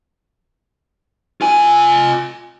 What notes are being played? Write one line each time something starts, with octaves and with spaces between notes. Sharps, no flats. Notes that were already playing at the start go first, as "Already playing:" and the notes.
F4 G#5